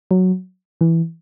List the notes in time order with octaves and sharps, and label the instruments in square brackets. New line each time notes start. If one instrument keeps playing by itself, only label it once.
[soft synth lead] F#3
E3